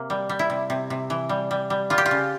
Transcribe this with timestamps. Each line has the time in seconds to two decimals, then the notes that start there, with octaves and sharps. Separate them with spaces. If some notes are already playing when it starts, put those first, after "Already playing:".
Already playing: C3 A#3
0.10 G3
0.29 G3
0.39 E4
0.50 C3
0.70 C3
0.90 C3
1.10 E3
1.29 G3
1.51 G3
1.70 G3
1.90 G3 F4
1.98 G4
2.06 F4
2.11 C#3